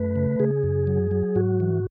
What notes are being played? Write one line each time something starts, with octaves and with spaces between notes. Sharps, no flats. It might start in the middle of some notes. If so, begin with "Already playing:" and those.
Already playing: F#2 A3 B4
C#3
C#3 G#4
F#2
F#3
F#3
G#2 F#4
E3